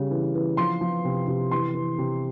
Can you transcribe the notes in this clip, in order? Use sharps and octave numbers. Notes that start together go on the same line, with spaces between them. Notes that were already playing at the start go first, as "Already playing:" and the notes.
Already playing: C#3 G3
E3
E3
F3 C6
F3
C3
C3
E3 C6
E3
C3